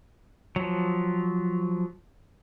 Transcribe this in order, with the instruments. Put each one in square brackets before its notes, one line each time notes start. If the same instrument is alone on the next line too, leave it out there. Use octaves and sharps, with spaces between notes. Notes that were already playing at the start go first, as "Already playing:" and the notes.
[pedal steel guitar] F3 F#3